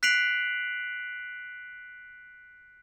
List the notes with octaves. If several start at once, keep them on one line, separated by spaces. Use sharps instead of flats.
F#6 B6 C7 D7 F7 F#7